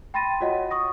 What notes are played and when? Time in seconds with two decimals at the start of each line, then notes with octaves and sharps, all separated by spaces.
0.14 G5 B5 C6 A6 A#6 D#7
0.40 F4 F#4 C#5 D#5 F#5
0.71 C#6 D#6 A#6